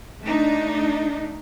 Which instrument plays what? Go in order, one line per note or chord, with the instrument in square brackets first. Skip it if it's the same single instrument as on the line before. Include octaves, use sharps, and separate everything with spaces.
[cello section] A3 D4 D#4